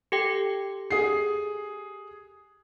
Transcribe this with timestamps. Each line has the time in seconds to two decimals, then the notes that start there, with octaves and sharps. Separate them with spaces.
0.12 G4 A4 G5
0.91 G#4 C7